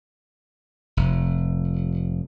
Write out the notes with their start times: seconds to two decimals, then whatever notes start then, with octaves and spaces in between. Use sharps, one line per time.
0.97 F1